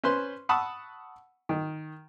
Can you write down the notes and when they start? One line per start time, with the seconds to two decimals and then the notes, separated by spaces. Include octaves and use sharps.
0.04 C#4 B4 C5 C6
0.49 F#5 A5 B5 C#6 D#6 E6
1.49 D#3